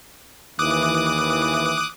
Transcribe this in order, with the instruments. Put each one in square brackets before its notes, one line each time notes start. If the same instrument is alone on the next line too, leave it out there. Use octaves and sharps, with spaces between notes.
[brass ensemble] D#2 E3 [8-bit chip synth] D6 D#6 F#6